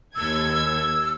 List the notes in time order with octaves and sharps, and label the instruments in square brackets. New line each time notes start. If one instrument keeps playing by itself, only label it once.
[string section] D#2 G#6 [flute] E6